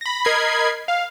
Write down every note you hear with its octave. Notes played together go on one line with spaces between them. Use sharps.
B5 A#6
A#4 D#5 B5 G#6 C7
F5